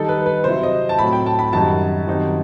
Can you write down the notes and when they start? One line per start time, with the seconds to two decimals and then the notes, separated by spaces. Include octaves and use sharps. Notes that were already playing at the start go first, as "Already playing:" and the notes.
Already playing: D#3 G3 D#4 A4
0.09 B4
0.26 B4
0.44 C3 F#3 C4 E4 C5
0.63 D#5
0.89 A5
0.99 A2 F#3 C4 B5
1.13 G5
1.26 A5
1.39 B5
1.53 F#2 D#3 G3 D#4 A5
2.07 F#2 D#3 G3 C4 D#4